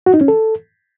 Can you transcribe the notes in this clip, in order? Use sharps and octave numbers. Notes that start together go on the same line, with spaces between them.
F#4
D#4
C#4
A4